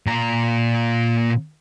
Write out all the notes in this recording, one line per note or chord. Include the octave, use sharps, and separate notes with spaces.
A#2 A#5